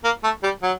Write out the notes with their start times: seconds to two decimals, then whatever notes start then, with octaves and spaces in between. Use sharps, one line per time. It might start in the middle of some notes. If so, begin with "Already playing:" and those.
0.04 A#3
0.24 A3
0.43 G3
0.62 F#3